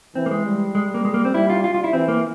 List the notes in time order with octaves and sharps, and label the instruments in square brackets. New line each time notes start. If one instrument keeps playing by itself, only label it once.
[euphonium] E3 [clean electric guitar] C4
[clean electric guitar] A#3
G#3
[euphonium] G3
[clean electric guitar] G#3
A#3
G#3
A#3
C4
[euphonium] G3 [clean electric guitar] E4
[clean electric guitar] F4
F4
F4
E4
[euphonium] E3 [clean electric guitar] C4
[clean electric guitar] A#3